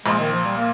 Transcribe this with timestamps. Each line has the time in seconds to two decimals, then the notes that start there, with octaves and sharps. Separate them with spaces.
0.06 A#1 A#2 G#3
0.19 D#3
0.32 F3
0.44 G3
0.57 A#3